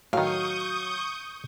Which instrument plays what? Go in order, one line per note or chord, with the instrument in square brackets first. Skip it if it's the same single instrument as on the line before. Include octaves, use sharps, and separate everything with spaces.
[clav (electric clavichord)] A2 D#3 [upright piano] F#3 [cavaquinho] F5 [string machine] C#6 D#6 G6